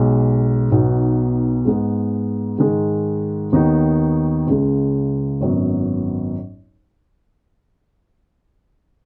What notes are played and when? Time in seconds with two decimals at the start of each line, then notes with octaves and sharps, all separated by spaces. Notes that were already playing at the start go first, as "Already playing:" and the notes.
Already playing: B1 B2 G#3
0.71 B1 B2 B3 D#4 F#4
1.65 G#2 G#3 B3
2.58 G#2 D#3 G#3
3.52 D#2 D#3 B3 D#4
4.47 C#2 C#3 G#3
5.41 G#1 F#2 F#3 B3